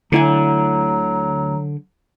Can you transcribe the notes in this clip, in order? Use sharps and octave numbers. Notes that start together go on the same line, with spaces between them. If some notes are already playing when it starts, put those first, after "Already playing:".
D2 D3 F#3 E4 G#5 A#5